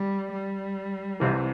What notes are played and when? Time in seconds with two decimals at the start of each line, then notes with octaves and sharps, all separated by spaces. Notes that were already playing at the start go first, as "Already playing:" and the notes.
Already playing: G3
0.32 G3
1.20 C2 C3 E3